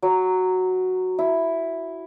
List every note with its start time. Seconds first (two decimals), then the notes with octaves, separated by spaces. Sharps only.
0.03 F#3
1.19 E4